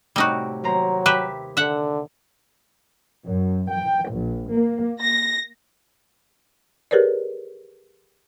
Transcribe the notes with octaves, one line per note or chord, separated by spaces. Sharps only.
A2 C3 G3 D#4 F#4
D#2 F#3 C5 A#5
G4 B4 E5
D3 E5 F#5
F#2
G5
A#1
A#3
A#6
G4 G#4 A#4 B4 C#5 D5